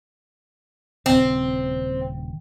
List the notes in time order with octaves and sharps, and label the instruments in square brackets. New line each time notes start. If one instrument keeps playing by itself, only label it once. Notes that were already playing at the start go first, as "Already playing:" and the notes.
[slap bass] D#1 C#3 [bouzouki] C4